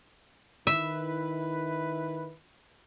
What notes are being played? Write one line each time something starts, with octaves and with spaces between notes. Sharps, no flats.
D#3 E4 B4 E5